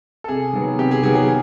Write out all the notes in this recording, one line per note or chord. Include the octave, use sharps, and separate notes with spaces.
A4
C3 G#4
D#3 F#3 B3
C3 G4
G#4
D#3 F#3 B3 G#4
G#4